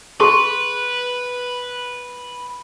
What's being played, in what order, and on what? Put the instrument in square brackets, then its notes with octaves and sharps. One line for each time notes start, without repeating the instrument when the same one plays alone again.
[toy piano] G#4 C6 C#6 [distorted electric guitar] B4